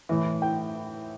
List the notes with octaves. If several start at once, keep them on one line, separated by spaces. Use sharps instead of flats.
A2 E3
G5